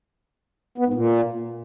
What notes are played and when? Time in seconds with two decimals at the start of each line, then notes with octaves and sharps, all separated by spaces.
0.78 B3
0.86 G#2
0.94 A#2